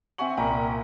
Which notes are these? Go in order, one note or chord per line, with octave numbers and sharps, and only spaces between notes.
C4 E5 F#5 G#5 C#6 F#7
C2 A#2 D5 G5 A#5